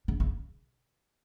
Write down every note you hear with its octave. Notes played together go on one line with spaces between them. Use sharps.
C#3
C#3